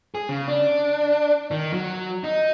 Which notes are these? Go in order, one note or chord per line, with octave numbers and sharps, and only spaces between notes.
G#4
C#3
D4
D#3
F#3
D#4